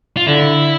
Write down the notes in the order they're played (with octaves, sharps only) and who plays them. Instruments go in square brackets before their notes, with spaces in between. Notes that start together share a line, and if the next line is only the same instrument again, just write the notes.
[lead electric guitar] F4
[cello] D3 [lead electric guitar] E4